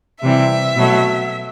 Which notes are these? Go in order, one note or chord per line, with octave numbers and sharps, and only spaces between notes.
C3 E3 G3 E5
B2 F#3 A3